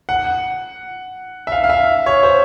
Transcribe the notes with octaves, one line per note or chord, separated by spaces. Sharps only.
F#5
E5
F5
F5
E5
C#5
C5